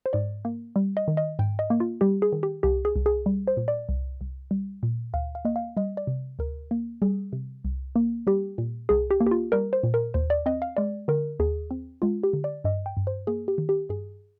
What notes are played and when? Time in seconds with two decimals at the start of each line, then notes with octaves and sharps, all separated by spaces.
0.06 C5
0.13 G#2 D5
0.45 A#3
0.76 G3
0.97 D#5
1.08 D#3
1.17 D#5
1.39 G#2 G5
1.59 D#5
1.70 A#3
1.80 F4
2.01 G3 G4
2.22 G#4
2.32 D#3
2.43 G4
2.63 C2 G4
2.85 G#4
2.96 C2
3.06 G#4
3.26 G3
3.47 C5
3.57 A#2
3.68 D5
3.89 C2
4.21 C2
4.51 G3
4.83 A#2
5.13 D2 F5
5.35 F5
5.45 A#3 D#5
5.56 F5
5.77 G3 D#5
5.97 D5
6.07 C3
6.39 D2 A#4
6.71 A#3
7.02 G3 G#4
7.33 C3
7.64 C2
7.96 A#3
8.27 G3 G4
8.58 A#2
8.89 C2 G#4
9.11 G4
9.20 A#3
9.27 G4
9.31 F4
9.52 G3 A#4
9.73 C5
9.83 A#2
9.94 A#4
10.14 D#2 C5
10.30 D5
10.46 C4 D#5
10.62 F5
10.77 G#3 D5
11.08 D3 A#4
11.39 D#2 G#4
11.71 C4
12.02 G#3 F4
12.23 G4
12.33 D3
12.44 D5
12.64 G2 D#5
12.86 G5
12.97 G2
13.07 C5
13.27 A#3 G#4
13.48 G4
13.58 D#3
13.69 G4
13.89 G2 G#4